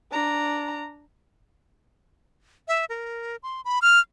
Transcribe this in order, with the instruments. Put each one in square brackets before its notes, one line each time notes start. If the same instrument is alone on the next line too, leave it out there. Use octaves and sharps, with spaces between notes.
[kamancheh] D4 A#5
[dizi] E5
A#4
C6
B5
F6